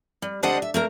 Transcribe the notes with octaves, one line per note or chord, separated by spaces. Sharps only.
G3
D2 G3 D4 C5 D#5 F#5
E5
A3 A#3 A#4